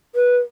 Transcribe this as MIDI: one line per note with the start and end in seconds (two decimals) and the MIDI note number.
0.15 0.37 71